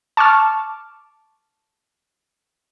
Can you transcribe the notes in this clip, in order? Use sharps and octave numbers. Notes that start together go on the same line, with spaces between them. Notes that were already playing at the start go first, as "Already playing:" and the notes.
A5 C#6 D6 F6